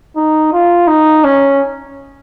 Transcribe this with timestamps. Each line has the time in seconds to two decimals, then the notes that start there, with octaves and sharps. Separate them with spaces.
0.16 D#4
0.52 F4
0.87 D#4
1.24 C#4